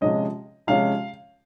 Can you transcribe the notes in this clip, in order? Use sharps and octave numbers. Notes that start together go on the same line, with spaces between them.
C3 F3 G#3 C#4 D#5
C3 F3 G#3 C#4 F5